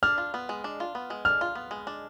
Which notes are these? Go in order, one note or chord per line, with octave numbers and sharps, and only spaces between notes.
D4 F6
F4
B3
G#3
D4
F4
B3
G#3
D4 F6
F4
B3
G#3
D4